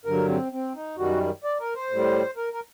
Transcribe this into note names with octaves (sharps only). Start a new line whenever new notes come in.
G2 D3 F#3 A#4
C4
C4
D#4
F#2 D#3 G3 F#4
D5
A#4
C5
A2 G3
A#4
A#4